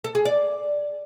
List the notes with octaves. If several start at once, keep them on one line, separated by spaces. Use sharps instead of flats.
A4
G#4
D5